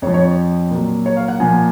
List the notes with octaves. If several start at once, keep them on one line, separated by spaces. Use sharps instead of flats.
F2 F3 C#5
C#5
A#2 F#3
C#5
F5
F#5
A#2 F3 G#5